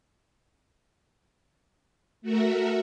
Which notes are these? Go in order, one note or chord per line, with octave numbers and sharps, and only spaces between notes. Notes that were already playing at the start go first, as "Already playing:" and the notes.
A3 F#4 A#4 E5